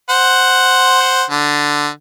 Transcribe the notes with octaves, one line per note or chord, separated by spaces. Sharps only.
C5 F#5
D3